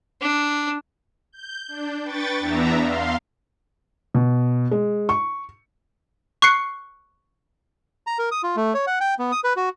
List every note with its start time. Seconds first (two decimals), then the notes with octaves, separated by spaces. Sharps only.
0.21 D4
1.32 G6
1.68 D4
2.03 B4 G5 C#6 A6
2.40 E2 B3 D4 E5 A#5
2.79 F5 C6
4.14 B2
4.71 G#3
5.09 C#6
6.42 C#6 F#6 C7 C#7
8.07 A#5
8.19 A#4
8.32 D#6
8.43 F4
8.56 A3
8.74 C#5
8.87 F#5
9.00 G5
9.19 B3
9.32 D#6
9.44 B4
9.56 F#4